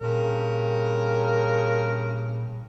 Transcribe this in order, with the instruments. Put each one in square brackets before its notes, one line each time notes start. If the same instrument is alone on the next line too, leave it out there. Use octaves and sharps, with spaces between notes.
[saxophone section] G2 C#3 [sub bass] A#2 [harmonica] A#4